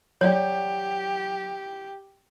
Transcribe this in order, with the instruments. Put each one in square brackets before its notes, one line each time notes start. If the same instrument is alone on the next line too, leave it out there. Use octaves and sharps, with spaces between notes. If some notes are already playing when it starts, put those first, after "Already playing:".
[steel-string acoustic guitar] F#3 F#5 [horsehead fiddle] G4 [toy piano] C#5 D5